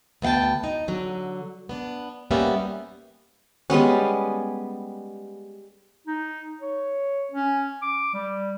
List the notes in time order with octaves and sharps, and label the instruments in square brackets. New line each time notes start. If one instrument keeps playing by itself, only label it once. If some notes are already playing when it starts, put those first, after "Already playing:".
[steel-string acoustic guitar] D2 B3 F5 G5 A5
D#4
D3 F#3
B3 D4
G3 A#3 B3 C#4 E5
[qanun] G3 G#3 B3 C#4
[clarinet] D#4
C#5
C#4
D6
G3